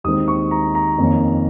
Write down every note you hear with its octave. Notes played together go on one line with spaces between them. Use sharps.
D#2 D#3 G#3 C4 D#6
C#6
A#5
A#5
F2 D#3 A#3 C#4